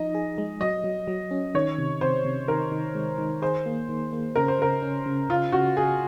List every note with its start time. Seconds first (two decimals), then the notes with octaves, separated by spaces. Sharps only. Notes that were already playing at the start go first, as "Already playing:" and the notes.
Already playing: F3 D#4 D#5
0.15 G#4
0.38 G#3
0.61 F#3 D#5
0.84 F#3
1.07 F#3
1.31 C#4
1.54 D#3 C#5
1.78 C3
2.01 C3 C5
2.25 C3
2.48 D#3 A#4
2.72 D#3
2.95 G#3
3.18 D#3
3.42 G#4 C5
3.66 A#3
3.89 D#3
4.13 A#3
4.36 C#3 A#4
4.48 C5
4.59 C#3 A#4
4.82 C#4
5.06 C#3
5.29 C#3 F4
5.52 C#3 F#4
5.76 F#4 G#4